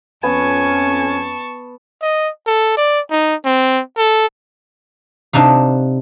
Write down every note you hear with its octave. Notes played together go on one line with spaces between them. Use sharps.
F2 B3 C#4 G#5 A5 C#6
D#5
A4
D5
D#4
C4
A4
C3 D4 D#4 F5